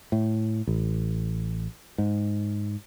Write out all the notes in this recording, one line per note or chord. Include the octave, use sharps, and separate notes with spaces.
A2
A1
G#2